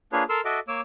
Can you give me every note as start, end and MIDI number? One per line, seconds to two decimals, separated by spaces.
0.13 0.23 58
0.13 0.23 62
0.13 0.23 65
0.13 0.23 68
0.13 0.23 71
0.13 0.23 73
0.29 0.41 69
0.29 0.41 70
0.29 0.41 84
0.29 0.41 88
0.29 0.41 89
0.45 0.59 66
0.45 0.59 69
0.45 0.59 75
0.45 0.59 76
0.45 0.59 86
0.68 0.81 58
0.68 0.81 73
0.68 0.81 86
0.68 0.81 88